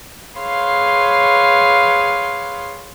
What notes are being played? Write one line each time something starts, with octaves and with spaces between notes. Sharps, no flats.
G#4 B4 C#5 F5 C6